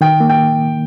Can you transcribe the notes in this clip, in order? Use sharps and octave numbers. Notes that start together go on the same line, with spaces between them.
D#3 G5
A#3
G5